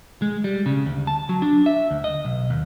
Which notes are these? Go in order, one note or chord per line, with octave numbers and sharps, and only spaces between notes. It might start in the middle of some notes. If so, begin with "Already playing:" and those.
G#3
G3
C#3
D2
A5
F#3
D4
E5
D2
D#5
B1
D#2